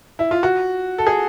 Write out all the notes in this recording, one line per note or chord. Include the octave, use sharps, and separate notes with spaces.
E4
F4
F#4
A4
G#4